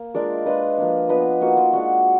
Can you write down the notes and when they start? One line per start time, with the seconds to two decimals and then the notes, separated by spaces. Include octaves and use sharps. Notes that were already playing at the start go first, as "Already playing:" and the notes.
Already playing: A#3
0.14 G#3 D4 F4 A#4 D5
0.46 G#3 D4 F4 B4 D#5
0.78 F3 A#3 D4
1.09 F3 B3 D4 F4 B4 D#5
1.41 A#3 D#4 F#4
1.57 F4
1.72 G#3 D4 F4 F#4